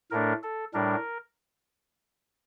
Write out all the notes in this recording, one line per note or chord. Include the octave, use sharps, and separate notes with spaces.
A2 A3 D4 A#4
A4
A2 G3 D4 A#4